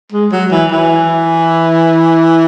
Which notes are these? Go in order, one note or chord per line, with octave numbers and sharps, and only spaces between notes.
G#3
F#3
E3
E3